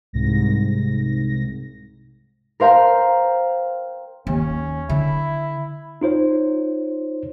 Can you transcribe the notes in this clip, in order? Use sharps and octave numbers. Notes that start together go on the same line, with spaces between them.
C2 G#2 A#6
A#4 C5 F5 G5 A#5
D#2 C#4
D3 E4
D#4 F4 C5 C#5